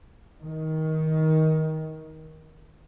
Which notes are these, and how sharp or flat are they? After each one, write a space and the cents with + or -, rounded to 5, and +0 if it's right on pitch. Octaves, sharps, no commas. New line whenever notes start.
D#3 +20